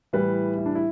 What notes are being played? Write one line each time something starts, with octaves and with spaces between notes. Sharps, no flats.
A2 E3 G3 B4
E4
D4
E4